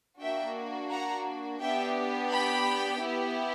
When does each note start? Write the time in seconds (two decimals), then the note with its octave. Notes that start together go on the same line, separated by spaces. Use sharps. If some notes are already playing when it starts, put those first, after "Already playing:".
0.21 A#3 D4 F#4 E5 G5
0.91 F#5 A#5
1.61 B3 D4 G4 E5 G5
2.31 G5 B5
3.02 B3 E4 G4